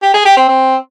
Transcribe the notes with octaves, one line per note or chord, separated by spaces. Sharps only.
G4
G#4
G4
C4
C4